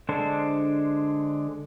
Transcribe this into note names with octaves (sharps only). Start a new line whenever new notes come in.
D3 G#3 D4 A4 C5